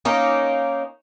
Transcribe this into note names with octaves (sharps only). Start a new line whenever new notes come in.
A#3 C#4 D#4